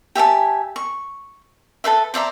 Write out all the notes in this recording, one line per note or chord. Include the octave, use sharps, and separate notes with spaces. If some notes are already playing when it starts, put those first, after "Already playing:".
G4 E5 G#5 A5
C#6
A4 B4 C5 E5
C5 D5 E5 A#5